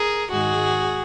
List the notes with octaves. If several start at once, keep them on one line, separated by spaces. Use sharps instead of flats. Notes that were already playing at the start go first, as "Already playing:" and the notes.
Already playing: G#4 A#4
G#2 D#3 G#3 F#4 G#4